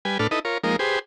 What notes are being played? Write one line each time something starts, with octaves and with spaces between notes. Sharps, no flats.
G3 B4 G#5
A2 D4 A4 B4 F6
D#4 E4 A4 B4 D#5
F4 A#4 C#5
F3 G#3 A#3 D#4 A#4
G4 G#4 B4 C5